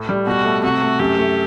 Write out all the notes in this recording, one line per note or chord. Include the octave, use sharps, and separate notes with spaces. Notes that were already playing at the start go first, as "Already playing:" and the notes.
Already playing: A2
G3
B2 F#4
A3
C3 F#4
A3
F#2 G4
A3